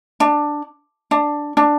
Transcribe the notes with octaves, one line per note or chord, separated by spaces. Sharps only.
D4
D4
D4